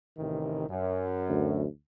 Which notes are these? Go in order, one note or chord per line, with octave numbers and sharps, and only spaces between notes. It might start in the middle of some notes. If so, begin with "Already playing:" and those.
A1 C3 D#3
F#2
D2